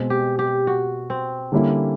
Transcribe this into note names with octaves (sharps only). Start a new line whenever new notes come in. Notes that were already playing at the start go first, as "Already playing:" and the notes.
Already playing: B2 G#3 C4
G4
G4
F#4
C4
D3 G3 A#3 C#4 E4